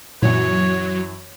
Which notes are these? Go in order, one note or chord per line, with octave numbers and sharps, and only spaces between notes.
F#2 A#2 E3 F#3 C#5